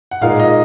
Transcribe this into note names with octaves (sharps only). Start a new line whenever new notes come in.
F#5
A#2 G#3 D#4 A#4 F5
D#5